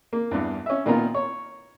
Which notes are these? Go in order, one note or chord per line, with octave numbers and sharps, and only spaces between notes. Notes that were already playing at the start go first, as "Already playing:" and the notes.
A#3
E2 G2
C#4 E5
A#2 D#3 B3 F4 A#4
C#5